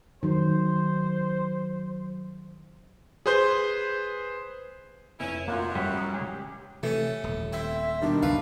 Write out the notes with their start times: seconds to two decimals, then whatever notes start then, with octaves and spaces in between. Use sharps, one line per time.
0.23 D#3 F#3 C5
3.26 G#4 B4 C5 C6 G6
5.20 F1 C#4 E4 B4
5.48 F#2 A#3 F4
5.75 A1 G3 C#4 C#5
5.97 G5 A#5 D#6
6.13 G#3 G4 G#4
6.83 C3 E3 A3 C#4
7.24 D#1
7.53 C4 E5
8.02 B2 D#3 G3 D4
8.23 C#2 G2 B4 F5